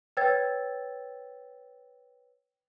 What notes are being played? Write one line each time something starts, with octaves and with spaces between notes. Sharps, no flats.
B4 C#5 G5 E6 G#6 A6